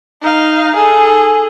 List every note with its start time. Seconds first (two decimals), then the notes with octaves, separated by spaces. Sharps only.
0.22 D#4 F5
0.75 G#4 A4